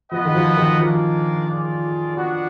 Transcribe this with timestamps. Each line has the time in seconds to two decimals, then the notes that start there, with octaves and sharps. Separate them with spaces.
0.12 F3 B3 F4 B4 D#5 F#5
0.25 D#3
0.35 F3
0.57 D#3
0.80 F3 G#3 D4 F4 A#4 D5
1.48 F4 G#4 D5
2.16 B3 D4 F#4